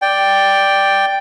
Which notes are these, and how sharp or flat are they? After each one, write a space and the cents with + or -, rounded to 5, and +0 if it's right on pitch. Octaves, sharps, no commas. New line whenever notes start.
D5 +0 G5 +0